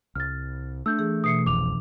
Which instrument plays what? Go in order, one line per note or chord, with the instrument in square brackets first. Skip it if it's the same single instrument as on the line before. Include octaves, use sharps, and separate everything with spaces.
[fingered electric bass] C2 [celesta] F6 A6
[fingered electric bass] A3 [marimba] D4 [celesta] E6 G6
[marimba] E3 G#4
[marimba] B2 E3 [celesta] D#6 C7 C#7
[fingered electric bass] F1 C2 F2 [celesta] D6 F7